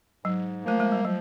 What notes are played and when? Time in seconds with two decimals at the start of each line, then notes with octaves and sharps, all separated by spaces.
0.25 G#2 F#3
0.64 F3 A3 A#3
0.80 G#3
0.92 G3
1.05 F3 F#3